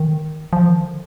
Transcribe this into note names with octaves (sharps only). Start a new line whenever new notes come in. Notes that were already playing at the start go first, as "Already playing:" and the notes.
Already playing: D#3
F3
D#3
D3